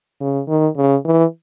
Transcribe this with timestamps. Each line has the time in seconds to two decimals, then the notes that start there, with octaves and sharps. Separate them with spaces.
0.21 C#3
0.48 D#3
0.76 C#3
1.05 E3